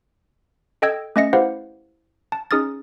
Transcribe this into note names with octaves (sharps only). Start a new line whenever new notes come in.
A4 D#5 G5 E6 G#6
A3 C#4 D#5 E5 A#6 C#7
E4 G4 B4 C5 F5 F#5
A5
C#4 D#4 G#4 D#6 F6 A6